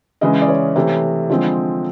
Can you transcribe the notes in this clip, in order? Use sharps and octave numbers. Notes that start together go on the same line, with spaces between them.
C#3 E3 G#3 C#4 D#5
D5
C#5
C3 E3 A3 C#5
D3 F3 G#3 C4